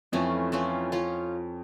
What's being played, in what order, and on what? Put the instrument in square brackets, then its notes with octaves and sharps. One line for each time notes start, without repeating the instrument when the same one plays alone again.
[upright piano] F2 [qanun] E3 A3 C#4 F4
[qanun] E3 A3 C#4 F4
C#4 F4